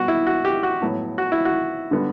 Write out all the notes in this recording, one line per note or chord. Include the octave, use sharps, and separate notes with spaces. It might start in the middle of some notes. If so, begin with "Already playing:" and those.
Already playing: B2 G3 B3 F#4
E4
F#4
G4
F#4
A2 F#3 B3
F#4
E4
F#4
D3 G3 B3